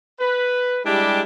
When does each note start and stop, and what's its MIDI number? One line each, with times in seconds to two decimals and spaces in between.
0.20 0.80 71
0.85 1.22 55
0.85 1.22 56
0.85 1.22 62
0.85 1.22 64
0.85 1.22 67